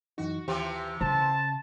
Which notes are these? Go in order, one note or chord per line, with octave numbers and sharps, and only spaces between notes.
F#2 E3 D#4 F#4
D#2 C3 E3 F3 G4 G5
C#3 C5 A5